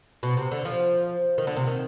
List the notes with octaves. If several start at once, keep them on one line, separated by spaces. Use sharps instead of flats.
B2
C3
D3
F3
D#3
D3
C3
D#3